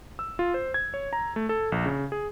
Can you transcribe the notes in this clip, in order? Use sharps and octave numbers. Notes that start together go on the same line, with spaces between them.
E6
F4
C5
G#6
C#5
A#5
A3
A4
A#1
C#3
G#4